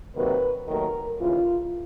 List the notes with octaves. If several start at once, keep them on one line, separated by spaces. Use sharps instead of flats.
C3 D#3 F#3 A#3 B4
D#2 D#3 F#3 A3 A#4
D#2 C#3 E3 F4